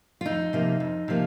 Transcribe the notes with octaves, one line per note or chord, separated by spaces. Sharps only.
F4
F2 D#4
C3 F3 A#3
F2
C3 F3 A#3